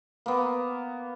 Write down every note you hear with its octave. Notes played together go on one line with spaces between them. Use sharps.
A#3 B3